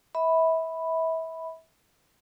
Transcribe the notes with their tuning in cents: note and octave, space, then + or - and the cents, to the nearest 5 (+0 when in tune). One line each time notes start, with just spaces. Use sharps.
E5 -30 B5 +0